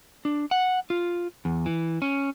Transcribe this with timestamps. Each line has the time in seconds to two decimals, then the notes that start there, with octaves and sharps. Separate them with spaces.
0.25 D4
0.51 F#5
0.90 F4
1.45 E2
1.66 E3
2.02 C#4